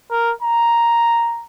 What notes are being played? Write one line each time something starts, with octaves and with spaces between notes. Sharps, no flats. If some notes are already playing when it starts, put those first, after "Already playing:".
A#4
A#5